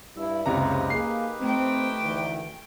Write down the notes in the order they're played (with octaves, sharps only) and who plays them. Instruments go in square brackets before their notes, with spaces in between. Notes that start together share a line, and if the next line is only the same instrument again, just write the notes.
[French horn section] G2 E4 [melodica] E6
[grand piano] F#1 C#2 A#5 [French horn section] C3 [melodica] D#4 G4 B4
[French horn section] A#3 G#4 [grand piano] C7
[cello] A3 G5 [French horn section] C4
[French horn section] D2 D#3 E3